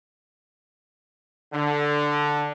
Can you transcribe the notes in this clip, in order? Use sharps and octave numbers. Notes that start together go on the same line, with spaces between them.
D3